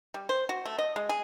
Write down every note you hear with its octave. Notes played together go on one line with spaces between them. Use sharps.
G3
C5
F#4
A3
D#5
G#3
G#4